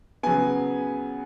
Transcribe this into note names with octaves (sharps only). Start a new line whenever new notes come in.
C#3 F#3 B3 G#5